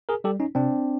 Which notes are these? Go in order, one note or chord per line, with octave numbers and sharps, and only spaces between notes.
G#4 A#4
G3 G4 A4
C#4 D#4
C3 C4 D4